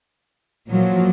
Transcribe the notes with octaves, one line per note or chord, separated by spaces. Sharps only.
A#2 F3 F#3